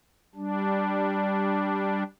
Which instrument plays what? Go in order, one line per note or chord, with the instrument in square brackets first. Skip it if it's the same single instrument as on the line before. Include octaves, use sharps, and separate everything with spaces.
[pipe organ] G3 D4